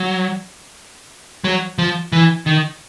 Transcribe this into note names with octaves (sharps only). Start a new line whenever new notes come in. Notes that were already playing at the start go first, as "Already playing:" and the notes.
Already playing: F#3
F#3
F3
E3
D#3